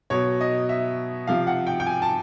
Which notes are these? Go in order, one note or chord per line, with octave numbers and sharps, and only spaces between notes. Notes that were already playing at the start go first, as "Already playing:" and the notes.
B2 F#3 C#5
D#5
E5
C3 F3 F5
F#5
G5
G5
G#5
A5